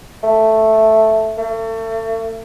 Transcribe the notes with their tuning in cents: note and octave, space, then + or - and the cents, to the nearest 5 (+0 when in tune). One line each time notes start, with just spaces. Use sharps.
A3 +0
A3 +35